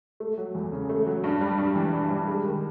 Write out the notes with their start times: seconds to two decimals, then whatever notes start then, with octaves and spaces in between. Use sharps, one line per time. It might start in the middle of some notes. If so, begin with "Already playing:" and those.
0.20 A3
0.38 F#3
0.55 E2
0.72 C#3
0.89 A3
1.07 F#3
1.24 G2
1.41 G3
1.58 G2
1.75 E3
1.93 G2
2.10 G3
2.28 G#3
2.44 D#3